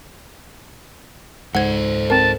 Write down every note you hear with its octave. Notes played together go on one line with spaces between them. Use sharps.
C#2 G#2 A4 C5 F#5 G#6
C4 A#4 A5